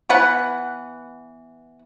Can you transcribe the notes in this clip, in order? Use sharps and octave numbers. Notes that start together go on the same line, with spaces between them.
E3 B3 B4 F#5